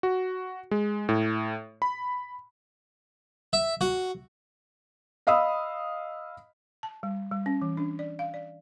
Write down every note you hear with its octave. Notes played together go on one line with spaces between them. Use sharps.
F#4
G#3
A2
B5
E5
F#4
D#5 F5 B5 D#6 E6
A5
G3
G3
C#4
E3
D4
D5
F5
D5